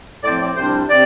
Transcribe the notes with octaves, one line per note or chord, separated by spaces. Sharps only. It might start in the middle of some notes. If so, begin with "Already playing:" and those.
A2 F3 C4 D5
D5
C2 C3 G3 D4 C5
C3 C4 D5